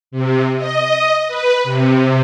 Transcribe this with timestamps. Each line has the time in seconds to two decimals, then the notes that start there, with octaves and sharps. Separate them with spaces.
0.11 C3
0.57 D#5
1.28 B4
1.64 C3